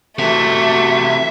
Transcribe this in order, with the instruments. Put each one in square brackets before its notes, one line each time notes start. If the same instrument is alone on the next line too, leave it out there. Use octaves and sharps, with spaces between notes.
[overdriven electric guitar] C3 E3 [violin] A3 [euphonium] F#4 [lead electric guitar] E5